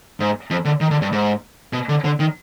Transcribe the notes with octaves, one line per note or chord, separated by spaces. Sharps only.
G#2
F2
D3
D#3
D3
G2
G#2
B2
D3
D3
D#3